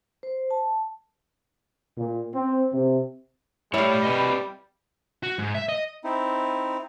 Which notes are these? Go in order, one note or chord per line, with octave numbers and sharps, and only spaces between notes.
C5
A5
A#2
C4
C3
A2 G3 E4 C#5 F5
C4 B4 D#5
F#4
G#2
E5
D#5
C4 D#4 E4